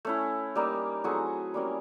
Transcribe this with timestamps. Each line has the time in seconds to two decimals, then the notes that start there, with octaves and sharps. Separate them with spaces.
0.05 A3 C#4 E4
0.55 G3 A#3 D#4
1.04 F#3 A3 C4 E4 F#4 G#4
1.54 G3 A#3 C#4